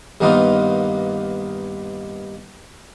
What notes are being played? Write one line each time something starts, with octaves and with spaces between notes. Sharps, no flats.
G2 D#3 A#3 B3 D#4 F4